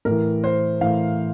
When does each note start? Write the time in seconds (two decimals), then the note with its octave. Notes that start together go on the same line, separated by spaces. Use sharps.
0.05 A2 A#4
0.10 E3
0.44 C5
0.81 A2 E3 F5